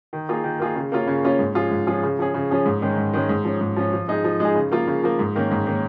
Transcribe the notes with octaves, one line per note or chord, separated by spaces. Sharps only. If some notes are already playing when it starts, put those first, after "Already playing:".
D#3
A#3 F4 G#4
D#3
A#3 F4 G#4
C#3
A#3 C#4 F4
C#3
A#3 C#4 F4
G#2
F3 C#4 F4 G#4
G#2
F3 C#4 F4 G#4
C#3
F3 C#4 G#4
C#3
F3 C#4 G#4
G#2
D#3 G#3 C#4
G#2
D#3 G#3 C#4
G#2
F3 C#4
G#2
F3 C#4
F3
G#3 D#4 G#4
F3
G#3 D#4 G#4
C#3
F3 A#3 F4
C#3
F3 A#3 F4
G#2
D#3 A#3 C#4
G#2
D#3 A#3 C#4